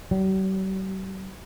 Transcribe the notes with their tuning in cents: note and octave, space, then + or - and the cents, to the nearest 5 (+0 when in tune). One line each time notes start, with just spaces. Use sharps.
G3 -45